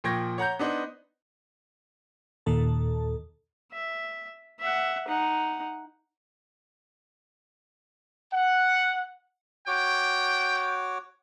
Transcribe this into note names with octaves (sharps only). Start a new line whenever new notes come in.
A#2 F3 G5 C#6 G#6 A#6
C#5 F#5 A#5 G6
B3 D4 D#4 C5
D#2 A#2 D#3 A4 A5
E5
E5 F#5
D#4 F#5
F#5
F#4 C#5 G5 D6